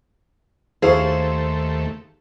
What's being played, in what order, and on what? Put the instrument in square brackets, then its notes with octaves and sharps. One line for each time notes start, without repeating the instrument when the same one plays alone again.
[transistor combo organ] D#2 A3 [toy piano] D#4 G4 [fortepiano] E4 G#4 F5 [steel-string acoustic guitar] C5